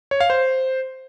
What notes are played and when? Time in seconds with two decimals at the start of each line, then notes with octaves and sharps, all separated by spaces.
0.11 C#5
0.20 F5
0.30 C5